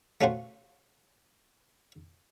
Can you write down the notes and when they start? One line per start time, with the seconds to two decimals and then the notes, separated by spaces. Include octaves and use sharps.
0.21 A3 C#4 F4 F#4 C5